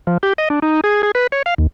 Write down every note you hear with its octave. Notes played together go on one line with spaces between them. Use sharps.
F3
G4
D#5
D4
D#4
G#4
G#4
B4
C#5
F5
D#2